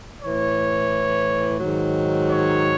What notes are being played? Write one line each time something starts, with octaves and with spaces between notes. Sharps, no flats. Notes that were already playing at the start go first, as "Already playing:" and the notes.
A2 E3 C#5
G#2 D#3 F#3
C#5